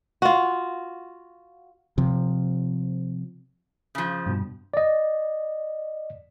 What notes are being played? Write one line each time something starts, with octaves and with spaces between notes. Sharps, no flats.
F4 F#4
C3 F3
C#3 F3
G2 B2
D5 D#5